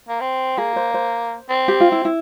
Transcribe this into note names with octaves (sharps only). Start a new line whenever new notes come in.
A#3
C4
A#3 G#4
C5
C5
C4
G4
F4
E4
E4